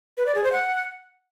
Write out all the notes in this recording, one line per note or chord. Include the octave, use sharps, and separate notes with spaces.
B4
D5
G#4
C5
F#5